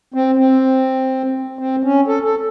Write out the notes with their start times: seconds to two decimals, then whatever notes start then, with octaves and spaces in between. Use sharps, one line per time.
0.14 C4
0.38 C4
1.59 C4
1.84 C#4
2.07 A4
2.24 A4